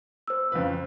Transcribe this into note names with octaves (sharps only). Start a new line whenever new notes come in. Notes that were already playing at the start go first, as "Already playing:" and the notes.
C5 E6
F2 C#3 B4